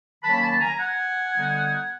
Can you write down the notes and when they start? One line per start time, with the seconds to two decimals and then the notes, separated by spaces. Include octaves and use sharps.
0.23 D#3 F#3 A#3 C#4 A5 B5
0.42 A5 B5
0.60 G#5 A#5
0.78 F#5 G#5
1.34 D3 G3 B3 D#4